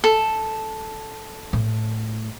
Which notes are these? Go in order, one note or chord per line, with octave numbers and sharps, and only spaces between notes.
A4
A2